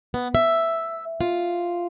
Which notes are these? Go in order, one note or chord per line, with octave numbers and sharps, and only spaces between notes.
B3
E5
F4